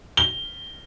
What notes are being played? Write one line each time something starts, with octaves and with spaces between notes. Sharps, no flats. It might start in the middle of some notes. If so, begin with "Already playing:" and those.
G7